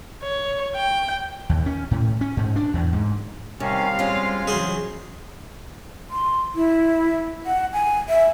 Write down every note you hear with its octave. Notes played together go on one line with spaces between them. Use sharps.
C#5
G5
D#2
C#4
A2
C#4
G#2
D4
E2
G#2
C3 D#3 G3 C4 C#4 F5
B2 G#3 C#4 F4
C#3 E3 F#3 G#4 C5
C6
E4
F#5
G#5
E5